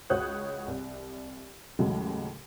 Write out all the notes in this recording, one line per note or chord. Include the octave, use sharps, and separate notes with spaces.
C#2 F#4 C#5 D#6 F#6 G6
C2
D#2 A2 C#3 F#3 G#3